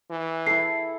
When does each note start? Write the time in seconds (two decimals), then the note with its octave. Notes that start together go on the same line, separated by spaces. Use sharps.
0.10 E3
0.47 E4 A4 C7